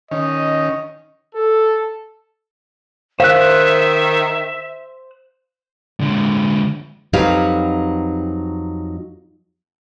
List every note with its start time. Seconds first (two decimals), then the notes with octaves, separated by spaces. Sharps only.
0.11 D#3 C#4 D#5
1.35 A4
3.20 D#3 C5 E5 F5 F#6
6.00 D3 G#3
7.13 F2 F#3 D#4 G4 B4 F5